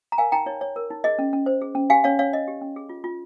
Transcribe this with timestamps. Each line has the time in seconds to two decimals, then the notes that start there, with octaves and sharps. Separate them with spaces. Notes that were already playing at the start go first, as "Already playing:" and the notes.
0.12 A#5
0.18 A#4 F5 G#5
0.32 D#4 G5 A#5
0.46 D#4 C#5
0.61 C#5
0.76 A#4
0.90 D#4
1.04 G#4 D#5
1.19 C#4
1.33 C#4
1.46 C5
1.61 G#4
1.75 C#4
1.90 G4 F5 G#5
2.04 C#4 C#5 F5
2.19 C#4 C#5 F5
2.33 C#5 D#5
2.48 G4
2.62 C#4
2.76 G#4
2.89 F4
3.04 F4